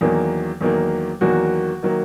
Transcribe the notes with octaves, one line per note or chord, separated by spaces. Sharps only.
E2 D#3 F#3 A#3
E2 D#3 F#3 A#3
E2 D#3 F#3 A#3 F#4
D#3 F#3 A#3